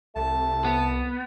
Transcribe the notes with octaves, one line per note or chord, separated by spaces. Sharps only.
C2 A3 A5
B3